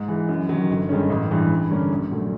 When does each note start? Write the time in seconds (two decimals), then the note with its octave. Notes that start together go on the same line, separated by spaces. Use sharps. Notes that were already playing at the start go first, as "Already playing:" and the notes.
Already playing: G#2
0.08 E3 G#3
0.29 F#2
0.49 D#3 F#3
0.70 G1
0.89 G2 D#3 G#3 C#4
1.10 A1
1.31 G2 E3 G#3
1.50 G2
1.71 D3 G3 A#3 C#4
1.90 A#1
2.11 A#2 F#3 A3